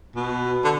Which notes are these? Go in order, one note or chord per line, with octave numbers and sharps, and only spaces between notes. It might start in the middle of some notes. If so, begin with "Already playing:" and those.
B2
D3